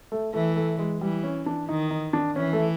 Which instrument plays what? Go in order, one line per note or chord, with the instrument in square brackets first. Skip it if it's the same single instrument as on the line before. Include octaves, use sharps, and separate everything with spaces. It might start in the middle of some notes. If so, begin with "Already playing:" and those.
[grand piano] A3
[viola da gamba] E3 [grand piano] A3
[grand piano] A3
G#3
[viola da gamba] E3 [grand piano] G3
[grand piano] C#4
D4
[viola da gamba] D#3 [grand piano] D#4
[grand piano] D#4
D4
[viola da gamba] E3 [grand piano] C#4
[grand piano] A3